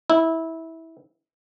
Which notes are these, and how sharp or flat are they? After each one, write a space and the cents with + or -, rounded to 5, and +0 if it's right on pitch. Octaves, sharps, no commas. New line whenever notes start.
E4 -20